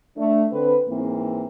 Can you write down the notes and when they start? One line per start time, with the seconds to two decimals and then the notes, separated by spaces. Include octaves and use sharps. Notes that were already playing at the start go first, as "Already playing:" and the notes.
0.17 A3 D4
0.52 D3 C4 A4 B4
0.89 G#2 E3 A#3 C4